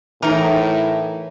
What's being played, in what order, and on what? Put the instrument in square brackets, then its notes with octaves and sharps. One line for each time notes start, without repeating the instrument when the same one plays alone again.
[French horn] A2 [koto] E3 A#4 [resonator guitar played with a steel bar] D#4 A#5